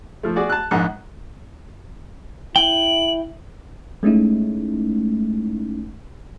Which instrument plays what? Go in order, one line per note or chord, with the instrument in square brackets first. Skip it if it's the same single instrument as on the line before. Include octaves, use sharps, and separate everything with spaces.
[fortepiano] F3 A3
F#4 G#4 D5
A5 F#6
A#1 G#2 F#5
[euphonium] E4 [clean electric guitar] G5 [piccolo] F#7
[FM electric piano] G#3 A3 C#4 D#4 E4